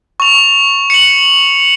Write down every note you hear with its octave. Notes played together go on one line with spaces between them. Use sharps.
C#6 F7
C#7 F#7